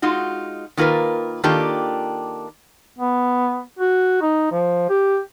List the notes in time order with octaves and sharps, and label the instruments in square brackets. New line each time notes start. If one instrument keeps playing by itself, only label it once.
[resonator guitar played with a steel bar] G#3 D#4 F4 F#4
D#3 A#3 F4 A#4 B4
D#3 A#3 D4 F4 G4 A4
[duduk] B3
F#4
D#4
F3
G4